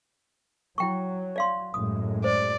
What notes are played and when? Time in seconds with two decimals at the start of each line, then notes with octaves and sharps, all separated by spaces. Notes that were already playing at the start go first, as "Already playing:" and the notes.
0.78 F#3 E4 G5 C#6
1.36 D5 F5 C6
1.74 F#2 A2 G#3 D#6
2.24 C5 D5